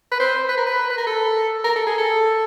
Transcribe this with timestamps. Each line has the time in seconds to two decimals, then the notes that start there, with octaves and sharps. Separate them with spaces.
0.12 B4
0.20 C5
0.49 B4
0.58 A#4
0.67 B4
0.90 B4
0.98 A#4
1.07 A4
1.64 A#4
1.76 A4
1.87 G#4
1.98 A4